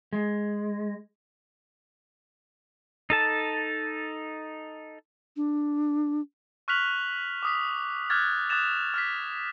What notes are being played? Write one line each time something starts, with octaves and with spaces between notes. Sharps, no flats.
G#3
D#4 A4 A5
D4
C#6 F6 F#6 B6 F7 F#7
D6 D#6 B6
D6 F6 F#6 G#6 A6
D#6 F#6 G#6 A6 E7 F7
F6 A6 B6